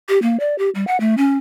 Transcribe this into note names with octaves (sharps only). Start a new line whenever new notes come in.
G4
A#3
D5
G4
G3
F#5
A3
C#4